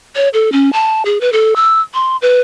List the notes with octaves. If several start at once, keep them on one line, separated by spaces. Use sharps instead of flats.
C#5
A4
C#4
A5
G#4
B4
A4
E6
C6
B4